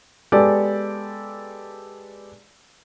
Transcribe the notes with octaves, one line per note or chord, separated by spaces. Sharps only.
G#3 B3 G4 A4 D5